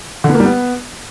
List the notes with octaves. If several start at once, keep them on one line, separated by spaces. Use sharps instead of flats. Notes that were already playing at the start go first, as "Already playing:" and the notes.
D3
B3
A#3
G3
B3